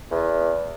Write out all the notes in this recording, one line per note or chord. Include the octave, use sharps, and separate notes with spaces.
E2